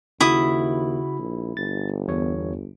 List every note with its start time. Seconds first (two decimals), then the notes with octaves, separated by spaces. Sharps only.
0.21 D#2 C#3 E4 F#4 B5 D#6
1.19 A#1
1.57 G1 A6
2.08 E2 C#5